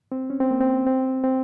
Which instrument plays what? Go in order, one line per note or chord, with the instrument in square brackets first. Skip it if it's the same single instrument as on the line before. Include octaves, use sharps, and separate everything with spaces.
[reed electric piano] C4
C#4
C4
A#3
C4
C4
C4